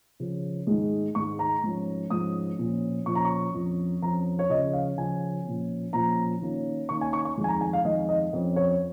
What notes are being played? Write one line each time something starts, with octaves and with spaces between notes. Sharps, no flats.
C#3 F3 C#4
G#2 D#3 G#3
G#2 D#3 G#3 C#6
A#5
G#2 F3 C#4
G#2 F3 C#4 D#6
A#2 F3 C#4
A#2 F3 C#4 C#6
A#5
C#6
F2 F3 C#4
F2 F3 C#4 A#5
C#5
C#3 F3 C#4 D#5
F5
C#3 F3 C#4 G#5
A#2 F3 C#4
A#2 F3 C#4 A#5
D#3 A#3 C#4
D#3 A#3 C#4 C#6
G#5
C#6
C#6
F2 D#3 G#3
G#5
A#5
G#5
F5
F2 D#3 G#3 D#5
D#5
F2 F3 C#4
C#5